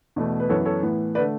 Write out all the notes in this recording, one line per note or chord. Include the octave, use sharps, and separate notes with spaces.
E2 B2 A3
B4
F#2 E3 B3 A4 C#5
A4 C#5
A2 E3 B3
D3 A3 B4 D5